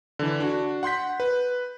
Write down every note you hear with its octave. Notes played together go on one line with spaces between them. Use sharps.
D3 E3
D4 F#4
F#5 C6 G6 B6
B4